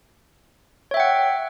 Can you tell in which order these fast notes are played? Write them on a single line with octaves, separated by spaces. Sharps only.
C#5 E5 G5 F#5